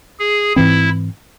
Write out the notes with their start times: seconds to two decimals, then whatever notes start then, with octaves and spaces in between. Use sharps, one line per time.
0.19 G#4
0.56 G#2 E3 C4 E4